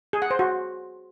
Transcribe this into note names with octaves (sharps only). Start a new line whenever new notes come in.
G#4
F#5
C5
F#4